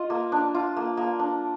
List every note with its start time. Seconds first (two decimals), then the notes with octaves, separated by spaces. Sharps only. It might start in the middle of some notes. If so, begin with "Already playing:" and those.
Already playing: F4 D#5
0.10 A#3
0.32 D4
0.55 F4
0.77 A#3
0.97 A#3
1.19 D4